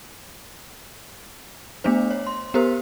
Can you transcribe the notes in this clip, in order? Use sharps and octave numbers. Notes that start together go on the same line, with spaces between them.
A3 B3 D4 C5
C#5
C6
B3 G4 A#4 C5